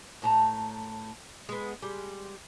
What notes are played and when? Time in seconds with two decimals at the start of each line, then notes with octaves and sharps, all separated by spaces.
0.22 A2 A5 A#5
1.49 G#3 B3
1.82 G3 G#3